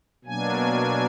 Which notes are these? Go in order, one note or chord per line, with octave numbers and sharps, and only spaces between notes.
B2 F#3 A#3 D4 G#5